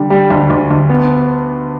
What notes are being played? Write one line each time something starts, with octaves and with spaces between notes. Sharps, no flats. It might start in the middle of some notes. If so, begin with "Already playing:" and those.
Already playing: D3 G3
G3
D2
D2
D2
B3